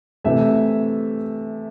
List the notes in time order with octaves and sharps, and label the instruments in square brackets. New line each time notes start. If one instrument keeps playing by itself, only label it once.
[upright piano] C3 E3 A3 E5